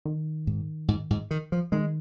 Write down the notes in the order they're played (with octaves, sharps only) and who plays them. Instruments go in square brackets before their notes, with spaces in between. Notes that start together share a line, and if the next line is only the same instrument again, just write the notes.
[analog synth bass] D#3
[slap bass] G#2
G#2
G#2
D#3
F3
[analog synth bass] D#3 [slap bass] G#3